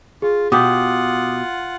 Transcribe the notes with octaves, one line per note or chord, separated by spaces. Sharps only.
F4 G#4
B2 F4 G4 F#5 D6 D#6